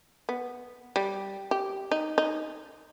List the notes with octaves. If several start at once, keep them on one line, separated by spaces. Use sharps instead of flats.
B3
G3
G4
D#4
D#4